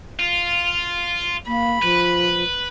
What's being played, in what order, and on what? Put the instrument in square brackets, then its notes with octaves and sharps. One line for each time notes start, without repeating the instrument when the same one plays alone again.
[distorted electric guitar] F4
[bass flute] A#3 [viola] B5
[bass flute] F3 [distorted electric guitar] B4